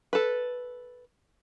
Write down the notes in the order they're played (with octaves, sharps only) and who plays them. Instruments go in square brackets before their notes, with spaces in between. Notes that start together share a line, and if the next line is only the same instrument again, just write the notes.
[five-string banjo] A4 B4